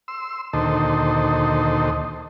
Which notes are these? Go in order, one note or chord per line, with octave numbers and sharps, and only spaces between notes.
C6 E6
D2 A#2 D#3 D#4 A4 C5